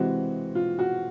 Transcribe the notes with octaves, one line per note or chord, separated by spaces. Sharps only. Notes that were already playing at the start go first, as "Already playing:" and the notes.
Already playing: C3 E3 G#3 C4 F#4
F4
F#4